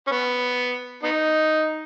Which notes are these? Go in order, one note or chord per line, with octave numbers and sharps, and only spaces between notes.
C#4
B3
B3 D#4